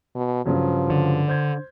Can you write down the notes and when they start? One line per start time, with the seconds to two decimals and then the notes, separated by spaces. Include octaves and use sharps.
0.15 B2
0.46 G2 C#3 F3 F#3
0.90 D3
1.28 C5 G6 G#6